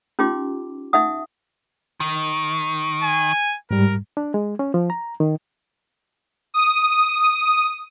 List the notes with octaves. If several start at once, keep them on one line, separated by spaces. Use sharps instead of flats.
C#4 D#4 F4 G4 C6 D6
D#4 E5 F#5 D#6
D#3
G#5
G#2 G3 A#4
D4
G#3
C#4
F3
A#5
D#3
D#6